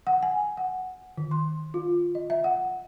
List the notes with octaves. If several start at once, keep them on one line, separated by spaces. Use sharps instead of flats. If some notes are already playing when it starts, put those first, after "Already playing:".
F#5
G#5
F#5
D#3
C6
F4
D#5
E5
F#5